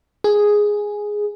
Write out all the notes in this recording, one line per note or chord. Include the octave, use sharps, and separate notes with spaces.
G#4